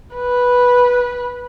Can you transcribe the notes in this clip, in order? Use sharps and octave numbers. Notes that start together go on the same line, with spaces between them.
B4